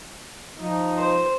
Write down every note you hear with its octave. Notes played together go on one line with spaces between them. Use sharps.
F3 D#4
C5